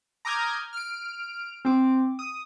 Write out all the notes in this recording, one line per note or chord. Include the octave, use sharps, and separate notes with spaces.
A#5 D6 D#6 F6 G6 G#6
F6 D7
C4 D6
D#6